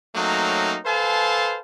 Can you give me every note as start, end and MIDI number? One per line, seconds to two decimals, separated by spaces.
0.16 0.77 54
0.16 0.77 57
0.16 0.77 58
0.16 0.77 60
0.16 0.77 61
0.16 0.77 63
0.86 1.60 69
0.86 1.60 71
0.86 1.60 72
0.86 1.60 77
0.86 1.60 80
0.86 1.60 81